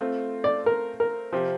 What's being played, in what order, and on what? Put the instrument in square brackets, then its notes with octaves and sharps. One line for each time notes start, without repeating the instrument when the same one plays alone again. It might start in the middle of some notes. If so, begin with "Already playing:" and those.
[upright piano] A3 C4 F4
[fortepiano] D5
A#4
A#4
[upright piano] C3 F3 C4 G4